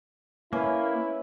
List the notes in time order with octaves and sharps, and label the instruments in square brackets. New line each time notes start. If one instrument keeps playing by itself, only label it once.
[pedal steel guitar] A#3 [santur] C#4 B4 [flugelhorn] E4